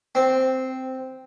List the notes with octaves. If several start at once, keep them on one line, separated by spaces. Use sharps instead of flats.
C4